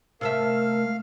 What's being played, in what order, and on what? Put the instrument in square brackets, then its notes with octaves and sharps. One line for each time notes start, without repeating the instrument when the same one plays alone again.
[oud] C3 A3 E5 [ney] A#4 [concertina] F5